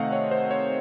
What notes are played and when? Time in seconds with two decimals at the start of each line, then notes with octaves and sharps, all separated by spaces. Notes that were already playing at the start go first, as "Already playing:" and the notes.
Already playing: C3 D#3 A3 C4 D#5 F5 F#5
0.12 C#5
0.31 C5
0.51 C#5